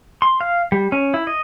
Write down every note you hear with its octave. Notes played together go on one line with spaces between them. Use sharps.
C6
F5
G3
C#4
E4
D#5